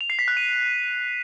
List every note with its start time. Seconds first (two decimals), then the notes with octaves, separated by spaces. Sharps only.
0.01 F7
0.10 C7
0.19 B6
0.28 F#6
0.37 D#7